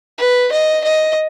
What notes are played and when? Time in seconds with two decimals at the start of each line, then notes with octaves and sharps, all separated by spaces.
0.18 B4
0.52 D#5
0.84 D#5